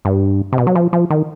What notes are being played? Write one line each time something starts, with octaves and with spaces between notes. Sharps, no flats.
G2
C3
B2
F#3
F3
F3
D#3